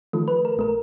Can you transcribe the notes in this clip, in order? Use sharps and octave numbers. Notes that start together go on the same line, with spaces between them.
D#3 F3 A3
B4
A#4
A#1 A3 A#4